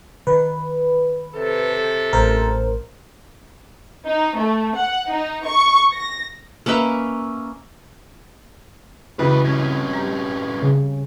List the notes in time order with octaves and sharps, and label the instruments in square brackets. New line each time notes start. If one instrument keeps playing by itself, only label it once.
[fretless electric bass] D#3 [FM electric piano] B4
[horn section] C3 A4
[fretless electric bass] A1 [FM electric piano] A#4 C5
[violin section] D#4
A3
F#5
D#4
C#6
A#6
[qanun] A#3 C#4 B4 E5
[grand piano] C#2 C#3 E3 [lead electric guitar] C#4 B4 [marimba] F#4
[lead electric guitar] G2 C#4 [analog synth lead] G#6
[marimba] C4
[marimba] G3 G4 [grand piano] A#5
[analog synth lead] C#3